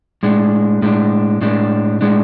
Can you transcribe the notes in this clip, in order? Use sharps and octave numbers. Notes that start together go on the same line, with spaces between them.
A2 G#3 D4
A2 G#3 D4
A2 G#3 D4
A2 G#3 D4